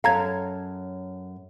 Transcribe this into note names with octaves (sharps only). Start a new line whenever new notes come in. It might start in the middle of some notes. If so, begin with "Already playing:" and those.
F#2 C#4 A4 F5 A#5 G#6